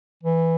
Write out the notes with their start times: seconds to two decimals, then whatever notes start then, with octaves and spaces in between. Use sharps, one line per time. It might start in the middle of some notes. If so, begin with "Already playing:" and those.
0.23 E3